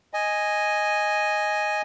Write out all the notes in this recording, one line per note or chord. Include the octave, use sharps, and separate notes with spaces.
D#5 G#5